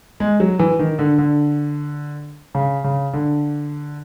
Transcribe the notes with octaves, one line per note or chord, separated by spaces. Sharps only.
G#3
F#3
E3
D#3
D3
D3
C#3
C#3
D3